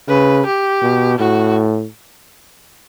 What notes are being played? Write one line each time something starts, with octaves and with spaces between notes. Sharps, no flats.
C#3 B4
G4
B2
A2 F#4